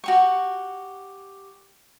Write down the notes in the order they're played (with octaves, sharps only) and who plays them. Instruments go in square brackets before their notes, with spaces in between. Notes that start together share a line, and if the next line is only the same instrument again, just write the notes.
[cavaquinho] F#4 G4 C#6